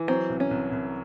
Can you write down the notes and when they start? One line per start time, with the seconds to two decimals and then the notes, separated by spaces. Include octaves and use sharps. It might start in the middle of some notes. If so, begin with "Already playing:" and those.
Already playing: E3
0.08 F#3 C4
0.30 C2
0.40 C#4
0.51 C2
0.72 C2